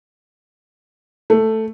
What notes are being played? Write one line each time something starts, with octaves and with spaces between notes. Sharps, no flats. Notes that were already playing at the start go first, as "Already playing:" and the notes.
A3